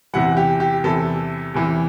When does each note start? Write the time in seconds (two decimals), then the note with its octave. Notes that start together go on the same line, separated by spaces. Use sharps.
0.14 E2 C3 E3 F#5
0.37 G4
0.60 G4
0.84 E2 C3 E3 A4
1.54 E2 C3 E3